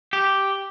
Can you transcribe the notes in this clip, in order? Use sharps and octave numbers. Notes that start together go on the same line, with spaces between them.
G4